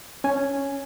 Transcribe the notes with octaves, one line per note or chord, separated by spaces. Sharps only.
C#4 G#5